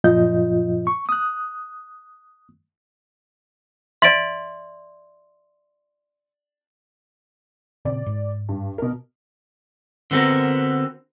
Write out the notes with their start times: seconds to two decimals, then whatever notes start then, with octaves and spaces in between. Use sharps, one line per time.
0.04 F#2 A#2 F3 F4 D#5 G6
0.87 C#6
1.09 D#6 F#6
4.02 D5 E5 C6 A6 D7
7.85 A#2 C#3 C4 D5
8.06 G#2
8.49 G2
8.78 B2 A#4
10.11 D3 B3 C4 F#4 A#4